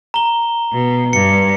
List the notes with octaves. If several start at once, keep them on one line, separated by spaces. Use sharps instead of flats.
A#5 G7
B2
G2 C#7